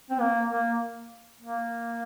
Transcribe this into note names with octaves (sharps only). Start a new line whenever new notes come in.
C4
A#3
A#3
A#3